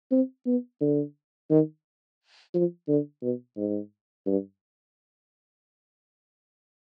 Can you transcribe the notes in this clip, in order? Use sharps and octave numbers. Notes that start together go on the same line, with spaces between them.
C4
B3
D3
D#3
F3
D3
B2
G#2
G2